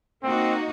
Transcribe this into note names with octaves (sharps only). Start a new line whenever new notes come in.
A#3 C4 D#4 F#4